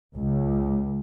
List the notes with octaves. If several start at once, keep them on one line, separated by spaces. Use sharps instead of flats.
C#2